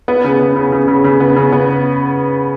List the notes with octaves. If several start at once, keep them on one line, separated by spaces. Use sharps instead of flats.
B3
C#3
B3
C#3
C#3
C#3
C#3
B3
C#3
B3